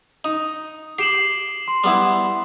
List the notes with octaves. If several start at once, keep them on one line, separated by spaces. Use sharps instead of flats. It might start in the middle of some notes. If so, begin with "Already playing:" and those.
D#4
G4 C7 E7 F#7
C6
G3 B3 E4